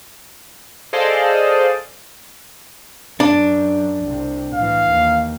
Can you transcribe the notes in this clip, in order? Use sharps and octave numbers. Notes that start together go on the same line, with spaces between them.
G#4 A4 C5 D5 D#5 F5
F#2 D4
C2 C3
A2 E3 F5
D#2